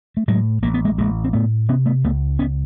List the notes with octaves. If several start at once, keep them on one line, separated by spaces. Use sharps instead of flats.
A3
A2 F#3 G#3
A1 A#3
B3
G#3 A#3
A1 G#3 A#3
C4
A2 A3 B3
C3 B3 C#4
A3 B3
C#2 A3 B3
C#2 B3 C#4